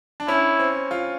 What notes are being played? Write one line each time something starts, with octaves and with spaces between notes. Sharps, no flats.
D4
C#4 E4
C4
F4